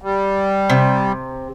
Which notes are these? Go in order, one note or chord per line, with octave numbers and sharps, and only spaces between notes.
G3
C3